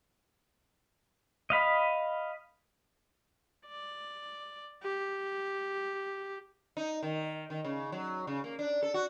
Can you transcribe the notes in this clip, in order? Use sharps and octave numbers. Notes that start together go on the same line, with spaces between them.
D#5 F5 B5
D5
G4
D#4
D#3
D#3
C#3
F#3
C#3
A#3
D4
A4
F#4